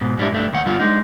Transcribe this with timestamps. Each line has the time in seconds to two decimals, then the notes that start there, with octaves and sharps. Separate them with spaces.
0.01 G#2 B2
0.18 G#2 G3 B3 D4 E4
0.32 G2 A3 D4
0.53 D#2 D#3 F#5
0.66 G2 D3 G3 B3 F4 F#5
0.80 G#3 D4 D#4